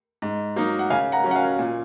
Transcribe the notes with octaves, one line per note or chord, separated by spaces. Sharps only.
G#2
F#3 A#3 D#4
F#5
C#3 F5 G#5
F#5 A#5
F#3 C#4
F#5
F5 G#5
A#2